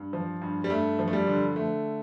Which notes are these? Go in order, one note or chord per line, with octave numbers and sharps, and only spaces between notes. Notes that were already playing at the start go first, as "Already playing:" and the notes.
Already playing: G2
F3
G2
G3
G2 A3
F3
A3
G3
D3
D3 A3